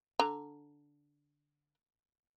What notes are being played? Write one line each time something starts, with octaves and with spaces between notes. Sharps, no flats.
D3 A#5